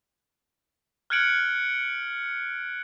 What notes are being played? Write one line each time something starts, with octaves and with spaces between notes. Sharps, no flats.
F6 F#6 G#6 C#7 D7 F#7